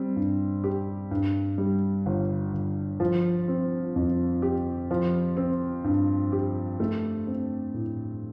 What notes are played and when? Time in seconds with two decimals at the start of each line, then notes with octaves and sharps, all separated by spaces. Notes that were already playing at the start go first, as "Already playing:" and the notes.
Already playing: G3 C4
0.16 G2
0.64 G4
1.11 G2
1.58 G3
2.06 G1
2.54 G1
3.00 F3
3.48 C4
3.96 F2
4.42 G4
4.91 F3
5.37 C4
5.84 G2
6.32 G4
6.80 A3
7.27 C4
7.74 A2